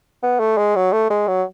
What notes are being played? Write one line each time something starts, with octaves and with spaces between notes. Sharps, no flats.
B3
A3
G#3
F#3
A3
G#3
F#3